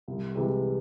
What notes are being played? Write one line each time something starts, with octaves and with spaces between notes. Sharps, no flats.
C2
C3 E3 G#3 C4